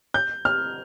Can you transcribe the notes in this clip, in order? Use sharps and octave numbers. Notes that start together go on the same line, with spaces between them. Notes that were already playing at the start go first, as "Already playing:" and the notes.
G6
F6